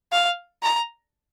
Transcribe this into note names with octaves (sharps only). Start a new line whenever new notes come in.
F5
A#5